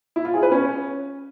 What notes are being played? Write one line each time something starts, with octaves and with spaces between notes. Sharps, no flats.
E4
F4
G#4
B4
C#4